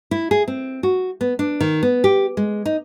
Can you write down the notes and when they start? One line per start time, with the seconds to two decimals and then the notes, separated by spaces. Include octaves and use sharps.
0.11 E4
0.31 G#4
0.48 C4
0.83 F#4
1.21 B3
1.39 D4
1.61 D#3
1.83 B3
2.04 G4
2.37 G#3
2.66 D#4